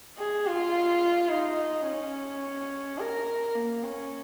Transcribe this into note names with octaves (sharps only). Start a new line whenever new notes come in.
G#4
F4
D#4
C#4
A#4
A#3
C#4